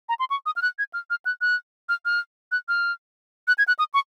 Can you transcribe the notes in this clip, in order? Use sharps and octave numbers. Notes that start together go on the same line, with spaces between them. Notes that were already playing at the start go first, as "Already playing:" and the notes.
A#5
C6
C#6
D#6
F6
F#6
G#6
F6
F6
F#6
F#6
F6
F6
F#6
F6
F#6
G#6
F#6
D#6
C#6